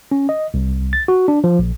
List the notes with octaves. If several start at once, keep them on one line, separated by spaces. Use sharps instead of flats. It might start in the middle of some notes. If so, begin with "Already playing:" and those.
C#4
D#5
C2
A6
F#4
D4
F3
A#1